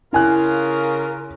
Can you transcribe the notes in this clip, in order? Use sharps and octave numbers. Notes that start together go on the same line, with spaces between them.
C#3 E4 F4 A#4 G#5 F#6